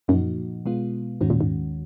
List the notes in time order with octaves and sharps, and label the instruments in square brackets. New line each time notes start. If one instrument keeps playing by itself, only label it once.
[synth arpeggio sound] F#2 [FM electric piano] A#2 F3 A#3 D#4 F#4
[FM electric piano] B2 G#3 B3 F4
[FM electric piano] D#2 D#3 G#3 C#4 F#4 [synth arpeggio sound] G#2
[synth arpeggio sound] A#2
G#2